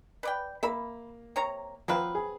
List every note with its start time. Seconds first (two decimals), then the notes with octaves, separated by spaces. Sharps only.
0.23 B4 D5 G5
0.63 A#3 E5 B5
1.36 C3 C#5 A#5
1.88 F3 F#3 C4 B4 F5
2.15 G#4